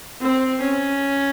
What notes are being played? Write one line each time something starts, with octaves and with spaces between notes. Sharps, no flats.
C4
C#4